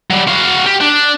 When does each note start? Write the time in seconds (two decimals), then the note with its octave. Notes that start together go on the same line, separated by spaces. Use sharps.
0.11 F#3 G3
0.28 F#4 F5
0.66 G4
0.81 D4